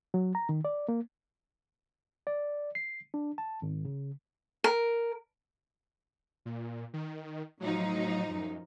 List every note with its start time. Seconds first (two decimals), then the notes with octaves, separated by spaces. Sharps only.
0.14 F#3
0.35 A#5
0.49 D#3
0.65 D5
0.88 A#3
2.27 D5
2.75 C7
3.14 D4
3.38 A5
3.62 G#1
3.85 C#3
4.64 A#4
6.45 A#2
6.93 D#3
7.60 A2 F3 F#3 D#4
8.31 F#2